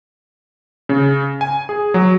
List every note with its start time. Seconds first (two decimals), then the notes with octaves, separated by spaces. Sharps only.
0.89 C#3
1.41 G#5
1.69 G#4
1.94 F#3